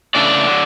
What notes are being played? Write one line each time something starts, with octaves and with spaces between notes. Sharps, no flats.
C#3 E3 A3 D4 D5
D3 F#3